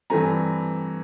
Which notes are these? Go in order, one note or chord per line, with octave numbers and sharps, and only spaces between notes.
G2 E3 A3 C4 G#5 A#5